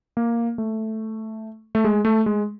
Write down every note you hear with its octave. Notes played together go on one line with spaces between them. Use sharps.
A#3
A3
A3
G#3
A3
G#3